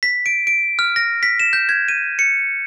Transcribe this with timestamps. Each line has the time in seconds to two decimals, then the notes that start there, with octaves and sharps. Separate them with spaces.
0.03 B6
0.26 D7
0.47 D7
0.79 F6
0.96 A#6
1.23 B6
1.40 E7
1.53 G6
1.69 G#6
1.88 D#7
2.19 C#7